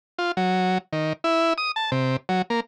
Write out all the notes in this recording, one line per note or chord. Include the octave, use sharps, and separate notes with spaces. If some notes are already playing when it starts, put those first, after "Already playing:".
F4
F#3
D#3
E4
D#6
A5
C3
F#3
A#3